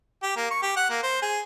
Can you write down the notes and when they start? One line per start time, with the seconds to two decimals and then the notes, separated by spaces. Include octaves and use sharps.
0.23 G4
0.37 A#3
0.51 C#6
0.62 G4
0.77 F#5
0.90 A#3
1.03 C5
1.22 G#4